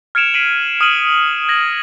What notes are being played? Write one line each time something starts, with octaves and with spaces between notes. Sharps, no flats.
F6 G#6 C#7 D7 E7 F7
B6 C7 D7 D#7 F#7
D#6 F6 D#7 F#7
G#6 A#6 F#7